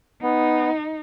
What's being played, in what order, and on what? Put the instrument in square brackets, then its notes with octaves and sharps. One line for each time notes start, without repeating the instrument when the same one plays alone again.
[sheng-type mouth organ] B3 [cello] D#4